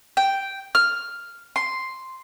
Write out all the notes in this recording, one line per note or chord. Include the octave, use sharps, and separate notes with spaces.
G5
F6
C6